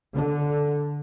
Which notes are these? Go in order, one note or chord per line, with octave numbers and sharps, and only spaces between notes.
D3